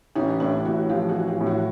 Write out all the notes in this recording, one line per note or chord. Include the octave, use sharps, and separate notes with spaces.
A1 C#4 D#4
A2 D4 E4
A1 E4 F#4
F3 F4 G4
F#4 G#4
A1
F4 G4
A2
E4 F#4